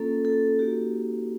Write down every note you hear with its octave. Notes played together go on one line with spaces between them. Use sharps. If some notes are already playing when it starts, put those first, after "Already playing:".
Already playing: A#3 C#4 F4 A4
A4
A#3 D#4 F#4 G4